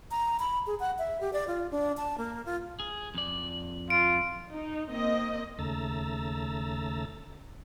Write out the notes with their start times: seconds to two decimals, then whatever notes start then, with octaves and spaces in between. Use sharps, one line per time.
0.11 A#5
0.39 B5
0.66 G#4
0.80 F#5
0.98 E5
1.21 G4
1.33 D5
1.48 F4
1.71 D4
1.97 A5
2.18 A#3
2.45 F4
2.80 G#4
3.14 F2 D5
3.90 F4 D7
4.52 D#4
4.92 A#3 C4 D#5
5.59 D#2 C#3 A3 A#5 E6 A6